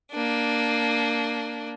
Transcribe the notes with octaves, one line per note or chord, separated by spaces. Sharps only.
A#3 D4